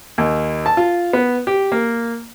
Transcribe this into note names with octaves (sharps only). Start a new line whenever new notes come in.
D#2
A5
F4
B3
G4
A#3